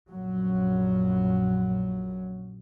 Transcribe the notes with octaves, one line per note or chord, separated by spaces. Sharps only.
A#1 F#2 F#3